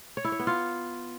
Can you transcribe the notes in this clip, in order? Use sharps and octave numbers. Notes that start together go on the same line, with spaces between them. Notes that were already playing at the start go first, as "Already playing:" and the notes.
C#5
E4
C#5
B3
F4